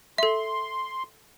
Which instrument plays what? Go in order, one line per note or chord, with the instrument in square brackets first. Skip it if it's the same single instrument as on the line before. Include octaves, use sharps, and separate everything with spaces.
[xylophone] A4 E5 [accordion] C6